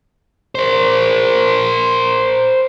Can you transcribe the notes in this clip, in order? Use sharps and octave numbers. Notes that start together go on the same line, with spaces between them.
A#4 C5